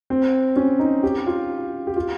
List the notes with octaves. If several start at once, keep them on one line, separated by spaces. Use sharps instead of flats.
C4
C#4
D#4
G4
F4
G4
F4